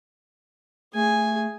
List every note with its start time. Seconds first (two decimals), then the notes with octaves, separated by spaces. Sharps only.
0.94 A3 G#4 G#5